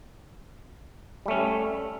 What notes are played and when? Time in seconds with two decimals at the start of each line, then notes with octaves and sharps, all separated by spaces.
1.26 G3
1.28 A3
1.31 C#4